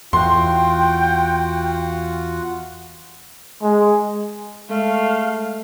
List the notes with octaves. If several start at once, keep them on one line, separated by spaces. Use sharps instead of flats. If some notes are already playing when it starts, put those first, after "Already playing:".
E2 F4 F#4 F#5 G5 C6
G#3
G#3 A3 F5